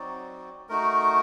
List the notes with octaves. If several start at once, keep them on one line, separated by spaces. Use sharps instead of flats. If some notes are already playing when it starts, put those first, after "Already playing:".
Already playing: F#3 C4 D#4 F#4 D5
A3 D#4 F#4 A#4